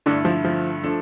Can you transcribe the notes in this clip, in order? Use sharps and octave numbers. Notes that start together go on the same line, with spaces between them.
G2 D3 A3 D4 E4 A4
F3
F3
F3 A3 D4 A4